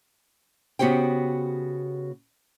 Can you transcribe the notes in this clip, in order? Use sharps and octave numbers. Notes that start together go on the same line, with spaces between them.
C#3 B3 F#4 G4 C5 G5